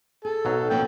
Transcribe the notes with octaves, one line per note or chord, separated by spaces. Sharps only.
G#4 A4
B1 F#3 D#4 F5
F3 A#3 C#4 A4 G5